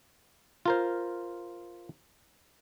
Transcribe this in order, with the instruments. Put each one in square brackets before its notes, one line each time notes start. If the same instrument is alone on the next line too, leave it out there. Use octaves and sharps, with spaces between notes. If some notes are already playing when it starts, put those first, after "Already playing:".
[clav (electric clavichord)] F4 A#4 C5